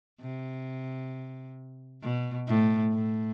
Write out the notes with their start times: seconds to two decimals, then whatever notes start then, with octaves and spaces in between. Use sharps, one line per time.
0.21 C3
2.02 B2
2.48 A2
2.93 A2